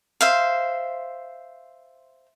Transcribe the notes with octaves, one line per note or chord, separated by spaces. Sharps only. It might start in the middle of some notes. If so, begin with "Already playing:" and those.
C5 E5 F5